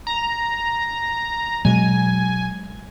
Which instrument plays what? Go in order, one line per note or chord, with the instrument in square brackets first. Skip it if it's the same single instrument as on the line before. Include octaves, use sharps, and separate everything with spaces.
[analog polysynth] A#5
[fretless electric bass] B2 F#3 G#3 [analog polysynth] G#5